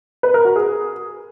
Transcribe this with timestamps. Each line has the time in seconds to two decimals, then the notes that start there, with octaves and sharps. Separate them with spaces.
0.23 B4
0.34 A#4
0.45 F#4
0.56 G#4